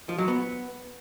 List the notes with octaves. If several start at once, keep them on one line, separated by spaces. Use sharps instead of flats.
F3
F#3
B3